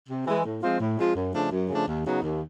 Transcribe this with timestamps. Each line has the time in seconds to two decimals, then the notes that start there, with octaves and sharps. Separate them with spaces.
0.09 C3
0.26 E3 G#3
0.44 A2
0.61 F3 G#3 C4 F4
0.79 A2
0.97 F3 G#3 C4 F4
1.16 F#2
1.33 C#3 F3 A3 D4
1.51 F#2
1.69 C#3 F3 A3 D4
1.87 D#2
2.05 C#3 F#3 B3 D#4
2.23 D#2